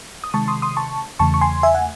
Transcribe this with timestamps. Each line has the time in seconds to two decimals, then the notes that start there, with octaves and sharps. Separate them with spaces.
0.24 D#6
0.34 C3 D#3 G#3 A5 C#6
0.48 C6 D#6
0.62 C6 D#6
0.77 A5 C#6
1.19 E2 C#3 E3 A3 A5 C#6
1.34 C#6
1.41 G#5 C6
1.63 E5 G#5
1.75 F#5